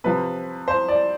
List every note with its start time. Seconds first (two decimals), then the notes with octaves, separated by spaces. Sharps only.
0.04 C3 F3 B4
0.68 C5
0.88 D5